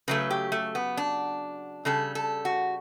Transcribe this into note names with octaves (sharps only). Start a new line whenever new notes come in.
C#3 F#3 A3 B4
G4
A3
B3
D4
C#3 G3 A4
A4
F#4